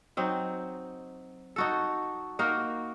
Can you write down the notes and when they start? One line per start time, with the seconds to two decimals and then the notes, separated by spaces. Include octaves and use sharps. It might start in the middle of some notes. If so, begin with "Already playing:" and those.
0.17 F#3 C4 D#4
1.56 D#4 F#4 A4
2.39 A#3 D#4 F#4 A#4